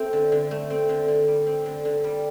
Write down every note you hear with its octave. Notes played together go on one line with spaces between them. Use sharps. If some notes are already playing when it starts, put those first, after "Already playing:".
Already playing: A3 C4
D3
D3
A3
C4
D3
D3
G3
C4
D3
D3
G3